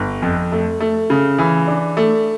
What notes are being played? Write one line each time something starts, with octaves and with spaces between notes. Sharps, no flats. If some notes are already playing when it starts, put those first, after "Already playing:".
Already playing: G1
F2
A3
A3
C#3
E3
D4
A3